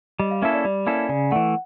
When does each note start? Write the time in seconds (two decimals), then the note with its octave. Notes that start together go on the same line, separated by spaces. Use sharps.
0.19 G3 D#5
0.31 F5
0.42 A#3 C#4 E4 A4 E5
0.53 D5
0.64 G3 D5
0.87 A#3 C#4 E4 A4
1.09 C#3 D5
1.31 E3 A3 F#5